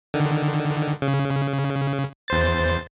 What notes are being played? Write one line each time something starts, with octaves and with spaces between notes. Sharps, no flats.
D3 D#3
C#3
E2 C5 A6